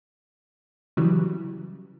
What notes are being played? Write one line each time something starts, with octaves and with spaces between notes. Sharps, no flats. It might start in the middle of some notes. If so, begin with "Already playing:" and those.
C#3 E3 F#3 G3